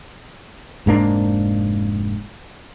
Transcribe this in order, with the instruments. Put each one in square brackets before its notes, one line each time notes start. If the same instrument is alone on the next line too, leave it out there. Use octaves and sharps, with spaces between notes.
[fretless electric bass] F1 G#2 A#3 D4